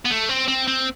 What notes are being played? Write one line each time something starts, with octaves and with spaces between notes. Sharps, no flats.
B3
A3
C4
C4
C4